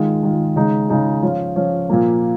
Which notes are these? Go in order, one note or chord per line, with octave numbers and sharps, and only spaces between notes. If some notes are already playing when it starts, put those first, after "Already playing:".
Already playing: D#3 G#3 F4
D#3 G#3 F4
C#3 G#3 D#4
C#3 G#3 D#4
F3 C#4 F4
F3 C#4 F4
A#2 F3 A#3